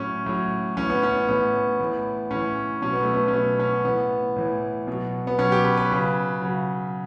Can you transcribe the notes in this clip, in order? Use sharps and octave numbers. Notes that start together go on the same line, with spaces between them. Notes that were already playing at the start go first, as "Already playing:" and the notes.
Already playing: A2 F#3 C#4
A2 F#3
A2 E3 C#4
B3
C#4
A2 E3 B3
A2 E3
A2 E3 C#4
B2 F#3 C#4
B3
A3
B3
C#4
B2 F#3 B3
C#4
A2 E3 B3
A2 E3
B2 F#3
B3
B2 F#3 C#4
G4
B4
B4
C#3 F#3
C#3 F#3